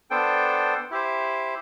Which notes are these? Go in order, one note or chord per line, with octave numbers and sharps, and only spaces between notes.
B3 D4 A4 C5 G5
E4 G4 C5